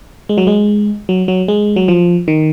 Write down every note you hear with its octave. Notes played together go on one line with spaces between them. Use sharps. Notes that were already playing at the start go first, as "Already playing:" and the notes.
G#3
F#3
G#3
F#3
F#3
G#3
F#3
F3
D#3